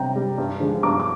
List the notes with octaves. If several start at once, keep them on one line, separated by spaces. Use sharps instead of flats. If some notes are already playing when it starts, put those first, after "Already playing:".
Already playing: C3 G3 G5 A#5
G3
G2
D3 F3 G#3
G2 A#5 D6
D6